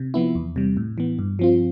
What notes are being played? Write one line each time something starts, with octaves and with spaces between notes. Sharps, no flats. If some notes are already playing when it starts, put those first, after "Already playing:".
Already playing: C3
F3 B3 E4
E2
C3 G3
A2
E3 B3
G2
F3 C4 F4